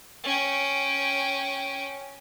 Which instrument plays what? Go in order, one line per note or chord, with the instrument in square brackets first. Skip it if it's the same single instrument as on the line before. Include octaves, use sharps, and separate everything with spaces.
[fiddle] C#4 G5